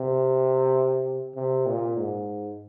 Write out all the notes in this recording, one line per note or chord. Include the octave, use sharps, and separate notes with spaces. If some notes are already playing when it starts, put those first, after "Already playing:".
Already playing: C3
C3
A#2
G#2